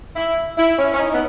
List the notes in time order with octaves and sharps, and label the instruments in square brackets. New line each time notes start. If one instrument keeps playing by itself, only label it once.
[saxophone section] E4
E4
C#4
C#4
D#4
B3